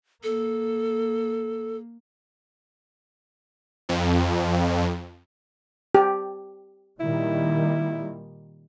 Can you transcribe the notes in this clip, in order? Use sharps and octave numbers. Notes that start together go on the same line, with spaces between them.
A#3 A4
F2
G4
A#2 D#3 G3 E4